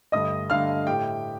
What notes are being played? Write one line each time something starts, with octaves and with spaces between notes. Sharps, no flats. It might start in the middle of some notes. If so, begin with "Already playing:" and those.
G2 D3 A3 D#5 D#6
G2 D3 A3 F5 F6
A2 A3 G4 G5